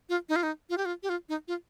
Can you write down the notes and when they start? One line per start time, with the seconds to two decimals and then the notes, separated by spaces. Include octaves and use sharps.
0.09 F4
0.29 D#4
0.36 F4
0.43 D#4
0.70 F4
0.78 G4
0.85 F4
1.03 G4
1.09 F4
1.29 D#4
1.48 F4